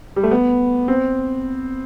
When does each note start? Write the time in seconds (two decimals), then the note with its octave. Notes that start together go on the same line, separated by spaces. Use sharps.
0.16 G3
0.23 A3
0.31 B3
0.88 C4